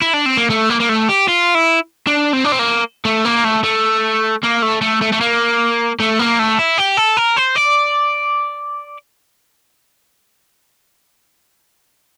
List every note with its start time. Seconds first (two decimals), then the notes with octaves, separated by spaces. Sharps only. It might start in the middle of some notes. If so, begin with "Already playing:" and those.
0.01 E4
0.13 D4
0.26 C4
0.37 A#3
0.50 A3
0.70 A#3
0.80 A#3
0.89 A3
1.09 G4
1.28 F4
1.55 E4
2.07 D4
2.33 C4
2.44 D4
2.52 C4
2.59 A#3
3.05 A3
3.25 A#3
3.45 A3
3.64 A3
4.43 A#3
4.62 A3
4.81 A3
5.02 A3
5.12 A3
5.21 A#3
6.00 A3
6.19 A#3
6.39 A3
6.59 E4
6.78 G4
6.97 A4
7.17 A#4
7.37 C5
7.56 D5